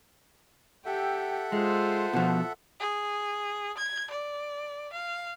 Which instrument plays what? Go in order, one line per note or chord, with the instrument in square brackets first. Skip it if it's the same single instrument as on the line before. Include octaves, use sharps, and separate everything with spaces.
[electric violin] G4 G5 [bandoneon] A4 E5 F#5
[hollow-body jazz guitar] G#3 [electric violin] F4 C5
[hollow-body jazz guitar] B2 F3
[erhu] G#4
G#6
D5
F5